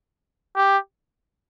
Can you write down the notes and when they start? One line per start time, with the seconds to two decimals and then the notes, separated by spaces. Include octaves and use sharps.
0.56 G4